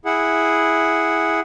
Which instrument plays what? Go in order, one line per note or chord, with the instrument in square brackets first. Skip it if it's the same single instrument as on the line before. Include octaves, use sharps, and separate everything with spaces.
[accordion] E4 G#4 F#5